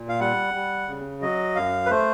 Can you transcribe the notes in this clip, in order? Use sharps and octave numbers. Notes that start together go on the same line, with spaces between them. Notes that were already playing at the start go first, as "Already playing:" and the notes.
Already playing: A#2
F5
G3 F#5
G3
C#3
F#3 D#5
F#2 F5
B4
A3 C5